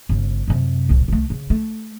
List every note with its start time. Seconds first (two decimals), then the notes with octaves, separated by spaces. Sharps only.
0.09 G1 C#3
0.48 F#2 C3
0.89 D1 C2
1.08 C2 A3
1.30 C#3
1.50 A3